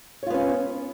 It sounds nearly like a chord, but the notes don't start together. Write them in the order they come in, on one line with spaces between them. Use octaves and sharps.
C#5 F4 B3 C#4